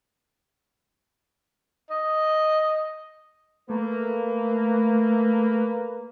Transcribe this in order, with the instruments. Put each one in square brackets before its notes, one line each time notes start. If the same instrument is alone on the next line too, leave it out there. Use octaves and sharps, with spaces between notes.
[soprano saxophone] D#5
[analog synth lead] A3 [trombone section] A#3 B4